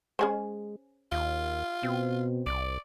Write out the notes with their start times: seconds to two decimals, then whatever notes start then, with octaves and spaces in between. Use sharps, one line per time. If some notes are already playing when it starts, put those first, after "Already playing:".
0.19 G#3 C#4 G#4 C5
1.12 D#2 F4
1.83 B2 C4
2.46 C2 D5